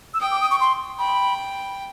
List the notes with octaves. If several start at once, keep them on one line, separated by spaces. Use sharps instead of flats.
E6
G5 D#6
D6
D#6
C#6
C6
G5 B5